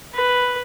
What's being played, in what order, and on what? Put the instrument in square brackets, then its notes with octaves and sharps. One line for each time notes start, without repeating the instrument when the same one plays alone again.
[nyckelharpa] B4